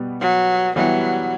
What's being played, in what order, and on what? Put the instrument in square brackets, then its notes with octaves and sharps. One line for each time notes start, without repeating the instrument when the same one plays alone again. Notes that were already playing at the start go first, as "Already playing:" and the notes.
Already playing: [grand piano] B2 G3 B3
[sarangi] F#3
[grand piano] E3 G3 B3 E4 G4 [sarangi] F#3